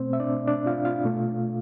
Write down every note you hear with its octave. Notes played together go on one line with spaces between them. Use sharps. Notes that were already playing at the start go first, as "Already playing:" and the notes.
Already playing: B2 A3 C4 C5
E5
D4 D5
D4 D5
F4 F5
F4 F5
B2 A3